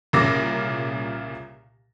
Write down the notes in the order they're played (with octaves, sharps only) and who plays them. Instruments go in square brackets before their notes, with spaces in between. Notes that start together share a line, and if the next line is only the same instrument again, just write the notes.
[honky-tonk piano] C2 A#2 C#3 D6 A#6